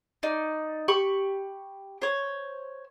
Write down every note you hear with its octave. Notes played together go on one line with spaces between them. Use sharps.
D#4 D5
G4 B5 C#6
C5 C#5